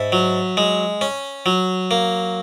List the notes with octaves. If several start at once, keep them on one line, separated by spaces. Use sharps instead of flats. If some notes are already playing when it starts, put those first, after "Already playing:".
Already playing: G#2 E5
F#3
G#3
C#4
F#3
A#3